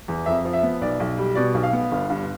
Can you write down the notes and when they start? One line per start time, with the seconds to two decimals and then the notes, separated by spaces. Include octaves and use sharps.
0.08 E2
0.26 F2 E5
0.45 F3
0.53 E5
0.63 B3
0.81 B1 D5
1.00 B1
1.18 G3
1.35 B2 D5
1.54 B1
1.63 F5
1.73 B3
1.91 G1
2.10 G2